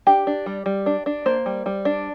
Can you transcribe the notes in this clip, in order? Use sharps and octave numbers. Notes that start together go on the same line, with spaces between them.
D4 G4
D4
G3
G3
D4
D4
A#3 C5
G3
G3
D4